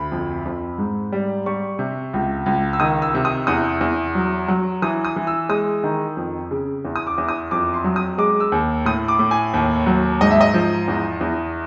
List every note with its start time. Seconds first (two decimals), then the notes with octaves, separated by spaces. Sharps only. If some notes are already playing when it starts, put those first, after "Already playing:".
Already playing: D2 B5
0.12 F2
0.45 F2
0.78 G#2
1.12 G3
1.46 G3 C#6
1.79 C3
2.14 C#2
2.46 C#2
2.73 E6
2.80 D#3 D#6
3.02 E6
3.15 C3
3.25 D#6
3.47 E2 D#6
3.81 E2
4.15 F#3
4.48 F#3
4.82 E3 D#6
5.05 D#6
5.16 E3
5.27 E6
5.49 G#3 D#6
5.84 D#3
6.17 F2
6.51 C#3
6.85 E2
6.96 D#6
7.07 D6
7.18 E2
7.29 D#6
7.51 F2 D6
7.74 C6
7.84 F#3
7.96 D#6
8.18 G#3 D6
8.40 E6
8.52 D#2
8.85 A2 D#6
9.08 D6
9.19 A2
9.31 G#5
9.54 D#2
9.86 F#3
10.21 G#2 D#5
10.31 E5
10.41 D#5
10.54 F3
10.88 E2
11.21 E2